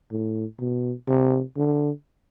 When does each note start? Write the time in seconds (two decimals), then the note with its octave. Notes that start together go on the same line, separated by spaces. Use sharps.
0.11 A2
0.59 B2
1.08 C3
1.57 D3